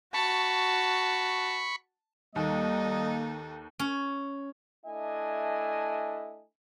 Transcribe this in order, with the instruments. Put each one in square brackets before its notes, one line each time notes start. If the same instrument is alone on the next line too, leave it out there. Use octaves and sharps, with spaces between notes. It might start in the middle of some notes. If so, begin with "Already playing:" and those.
[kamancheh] F#4 A5 [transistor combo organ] B5 C#6
[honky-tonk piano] D#2 [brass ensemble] G3 D#5 [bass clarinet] A#3 [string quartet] D#4 A4
[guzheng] C#4
[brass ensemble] A3 D4 E4 D#5 G#5